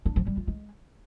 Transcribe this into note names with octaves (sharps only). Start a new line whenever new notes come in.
D4
F3
G3
F4
G#3